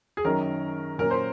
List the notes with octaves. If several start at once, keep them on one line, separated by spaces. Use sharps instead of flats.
G#4
F#2 D#3 F#3 C#4 A#4
A#2 F#3 A#3 C#4 A#4
C5